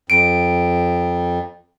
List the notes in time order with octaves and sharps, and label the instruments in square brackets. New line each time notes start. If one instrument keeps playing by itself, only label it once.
[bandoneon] F2 [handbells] D7